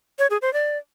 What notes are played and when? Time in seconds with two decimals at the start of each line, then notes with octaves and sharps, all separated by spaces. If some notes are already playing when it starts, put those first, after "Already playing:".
0.19 C#5
0.30 G#4
0.42 C5
0.53 D5